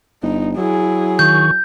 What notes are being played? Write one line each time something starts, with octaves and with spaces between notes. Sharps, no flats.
G1 D#4
F#3 E4 G#4
D#3 C#6 G6